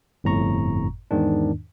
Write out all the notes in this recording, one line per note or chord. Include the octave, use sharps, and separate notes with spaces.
G1 F2 A2 A#5 C#6
E2 G#2 D#3 D4